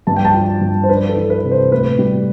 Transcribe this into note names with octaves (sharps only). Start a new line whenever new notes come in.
G2 A5
G5
A5
F3
G2
C5
D4 B4
A4
E3
B4
C3
C5
A2 B4
G3